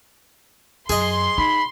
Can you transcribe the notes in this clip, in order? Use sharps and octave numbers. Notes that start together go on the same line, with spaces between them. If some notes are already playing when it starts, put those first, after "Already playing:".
F#2 G#4 D#5 C6
D#4 B5